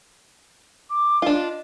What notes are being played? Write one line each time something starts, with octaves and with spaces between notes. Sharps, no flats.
D6
D4 F4 D#5